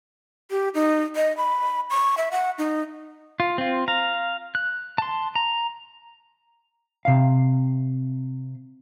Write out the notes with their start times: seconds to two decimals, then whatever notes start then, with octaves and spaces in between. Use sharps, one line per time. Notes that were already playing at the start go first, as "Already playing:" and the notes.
0.51 G4
0.74 D#4
1.16 D#5
1.37 B5
1.90 C#6
2.18 E5
2.32 F#5
2.58 D#4
3.40 F4
3.58 C4 F4
3.88 F5 A#5
4.55 F#6
4.98 A5 C6
5.35 A#5
7.05 C3 F5